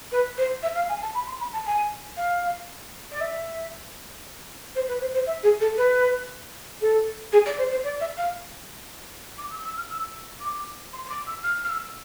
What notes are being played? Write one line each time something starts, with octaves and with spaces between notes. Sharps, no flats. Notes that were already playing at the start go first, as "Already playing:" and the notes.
B4
C5
E5
F5
G#5
A5
B5
C6
B5
A5
G#5
F5
D5
E5
C5
B4
C5
C5
E5
G#4
A4
B4
A4
G#4
D5
C5
C5
D5
E5
F5
D6
E6
E6
F6
E6
D6
C6
C6
D6
E6
F6
F6
E6